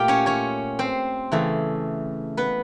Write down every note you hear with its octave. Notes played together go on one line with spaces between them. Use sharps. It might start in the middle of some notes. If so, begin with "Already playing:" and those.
Already playing: A#2 A3 F4 G4 F5 G5
C#4 C#5
C#4 C#5
C4 C5
C#3 E3 A3
B3 B4